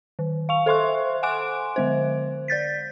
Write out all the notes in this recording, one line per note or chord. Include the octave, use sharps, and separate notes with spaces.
D#3
F5 C#6 F7
A4 C5 E5 C6 C#6 F#6
F#5 G#5 C6 D6 F#6 D7
D3 G#3 C5
D5 G6 A6 B6